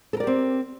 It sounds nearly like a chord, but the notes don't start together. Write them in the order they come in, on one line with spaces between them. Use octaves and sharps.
A4 A#4 D5 G4 C4